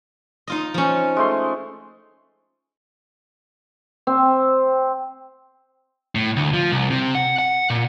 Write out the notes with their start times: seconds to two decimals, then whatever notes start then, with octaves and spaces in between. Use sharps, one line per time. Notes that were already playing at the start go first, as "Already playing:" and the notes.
0.47 D#4 F4 D#5
0.74 F3 C#4
1.16 G#3 A3 C6
4.07 C4
6.15 A2
6.36 D2
6.54 F3
6.71 C2
6.90 C3
7.15 F#5
7.39 F#5
7.70 A#2